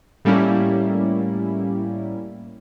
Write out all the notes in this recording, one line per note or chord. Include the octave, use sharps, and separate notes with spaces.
A2 G3 A#3 C#4 E4